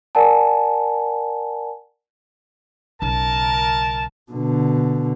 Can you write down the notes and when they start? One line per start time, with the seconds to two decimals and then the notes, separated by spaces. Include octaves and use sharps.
0.15 A#4 D5 F#5 G#5 A5
3.02 B1 C#3 A#4 A5
4.32 B2 D3